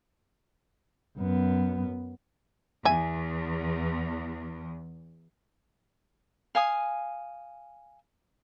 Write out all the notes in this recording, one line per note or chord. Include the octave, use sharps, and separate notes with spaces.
F#2 B3
E2 E5 G#5
F5 G#5 D#6